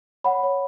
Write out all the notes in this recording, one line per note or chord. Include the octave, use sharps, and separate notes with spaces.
C#5 F#5 B5
C#5